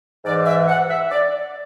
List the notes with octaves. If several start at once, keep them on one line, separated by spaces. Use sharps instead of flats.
G#2 E3 D5
E5
F#5
E5
D5